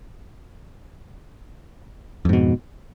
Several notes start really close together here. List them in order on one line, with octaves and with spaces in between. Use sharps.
F2 G#2 B2